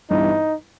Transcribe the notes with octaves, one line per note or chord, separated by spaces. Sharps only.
G2 E3 G3 B3 D#4 E4